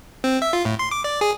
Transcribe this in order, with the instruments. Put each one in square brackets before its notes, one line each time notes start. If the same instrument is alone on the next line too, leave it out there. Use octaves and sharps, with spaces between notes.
[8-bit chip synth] C4
E5
F4
A2
C6
D6
D5
G#4